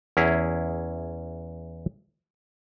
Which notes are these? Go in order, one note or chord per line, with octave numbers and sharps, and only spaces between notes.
E2 C#4 E4 G#4 A#5